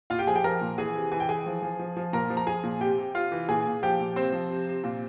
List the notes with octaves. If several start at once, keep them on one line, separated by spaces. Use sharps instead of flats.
A#2 F4 F5
G4 G5
F3 G#4 G#5
G4 G5
F3 A#4 A#5
A#2
E3 G#4 G#5
C3
E3 G#5
G5
E3 G#4 G#5
F3
F3
F3
F3
A#2 A#4 A#5
F3
A#5
F3 G#4 G#5
A#2
C3 G4 G5
C3
C3 F4 F5
E3
A#2 G#4 G#5
A#2
F3 G4 G5
A#2
C3 C4 C5
F3
C3
C3
A#2